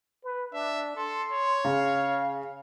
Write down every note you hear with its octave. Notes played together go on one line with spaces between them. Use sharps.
B4
D4 E5
A4 C6
C#5
C#3 F5